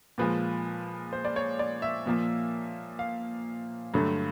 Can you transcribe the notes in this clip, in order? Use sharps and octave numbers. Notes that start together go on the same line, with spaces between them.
A#2 F3 G#3 B4
C5
D5
C#5
D5
E5
A#2 F3 A#3
F5
G2 D3 F#3 A3